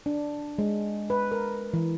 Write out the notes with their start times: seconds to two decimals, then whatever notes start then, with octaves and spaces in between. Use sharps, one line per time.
0.06 D4
0.58 G#3
1.10 B4
1.32 A#4
1.73 E3